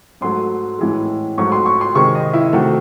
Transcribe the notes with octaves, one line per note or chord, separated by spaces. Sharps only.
G#2 F#3 A3 C6
A2 E3 G#3
G#2 F#3 A3 C#6
C6
C#6
C6
C3 D#3 G#3 C#6
D#5
E4
C3 D#3 A3 F#4